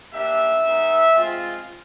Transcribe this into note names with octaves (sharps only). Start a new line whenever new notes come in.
A#3 D4 G4 E5
G#3 B3 D#4
G#3 C4 F4